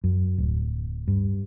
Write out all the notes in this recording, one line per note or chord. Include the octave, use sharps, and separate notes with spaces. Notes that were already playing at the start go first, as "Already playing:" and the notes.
F#2
D1
G2